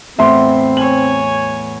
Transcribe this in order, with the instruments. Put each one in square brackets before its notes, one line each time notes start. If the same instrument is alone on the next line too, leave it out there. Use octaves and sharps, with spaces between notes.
[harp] E2 A2 [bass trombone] C4 [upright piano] E5 C6
[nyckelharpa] C#5 G#5 [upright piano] F#7